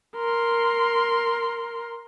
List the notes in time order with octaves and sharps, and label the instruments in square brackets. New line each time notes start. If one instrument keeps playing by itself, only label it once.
[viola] A#4 C6